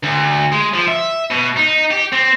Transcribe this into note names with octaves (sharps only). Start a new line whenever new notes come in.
D2
G#3
F3
E5
B2
D#4
G4
C4